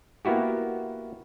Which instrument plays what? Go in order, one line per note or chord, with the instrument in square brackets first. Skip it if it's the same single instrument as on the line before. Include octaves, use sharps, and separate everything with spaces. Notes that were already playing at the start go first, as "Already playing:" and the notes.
[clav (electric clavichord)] A#3 B3 E4 F#4 G4